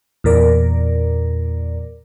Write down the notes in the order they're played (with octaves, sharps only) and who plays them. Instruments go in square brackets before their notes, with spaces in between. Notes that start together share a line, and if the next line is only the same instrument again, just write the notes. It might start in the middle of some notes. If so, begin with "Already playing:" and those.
[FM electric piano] E2 A#2 A#4 D5